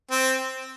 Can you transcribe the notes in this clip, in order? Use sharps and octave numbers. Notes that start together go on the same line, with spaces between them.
C4